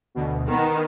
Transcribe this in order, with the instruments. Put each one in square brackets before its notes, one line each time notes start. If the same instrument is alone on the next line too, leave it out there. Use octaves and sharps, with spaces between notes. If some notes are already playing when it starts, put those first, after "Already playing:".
[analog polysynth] D2 B2
[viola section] D#3 [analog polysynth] B3